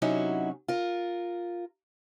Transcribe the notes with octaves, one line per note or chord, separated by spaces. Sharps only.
C3 F#3 C#4 D#4 E4 F#4
F4 A#4